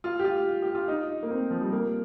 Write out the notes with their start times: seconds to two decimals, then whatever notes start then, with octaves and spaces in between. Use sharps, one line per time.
0.04 F4
0.19 G4
0.24 F4
0.62 G4
0.75 F4
0.88 D#4
1.23 A#3
1.30 C4
1.51 F3
1.61 G3
1.72 A#3